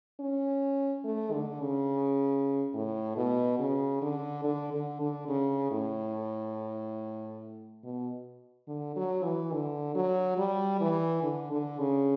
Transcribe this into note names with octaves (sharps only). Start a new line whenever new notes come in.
C#4
A3
D3
C#3
A2
B2
C#3
D3
D3
D3
D3
C#3
A2
B2
D3
F#3
E3
D3
F#3
G3
E3
D3
D3
C#3